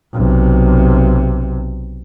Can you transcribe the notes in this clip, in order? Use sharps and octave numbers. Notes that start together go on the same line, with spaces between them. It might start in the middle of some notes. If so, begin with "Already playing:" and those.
B1 C3